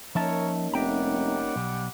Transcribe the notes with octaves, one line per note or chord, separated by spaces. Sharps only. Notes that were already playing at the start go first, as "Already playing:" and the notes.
F3 A#3 C#4 D#4 A#4 C#5 E5 A5
F1 G3 E5 F#5 G5 A#5 D6
B1